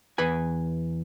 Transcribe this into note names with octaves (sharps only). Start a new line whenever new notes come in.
E2 B4 G#5